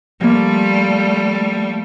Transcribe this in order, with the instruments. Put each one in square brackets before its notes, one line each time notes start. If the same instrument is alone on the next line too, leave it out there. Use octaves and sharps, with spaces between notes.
[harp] F3 A#3 [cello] G3 A3